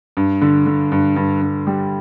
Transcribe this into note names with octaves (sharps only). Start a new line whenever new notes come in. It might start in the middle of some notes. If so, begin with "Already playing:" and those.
G2
D3
D3
G2
G2
G2
G3